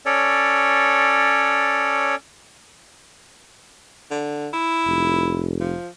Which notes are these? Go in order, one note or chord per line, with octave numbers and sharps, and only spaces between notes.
C#4 A4 C#5 D5
D3
E4
F1
F3